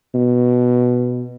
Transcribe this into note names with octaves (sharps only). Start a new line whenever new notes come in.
B2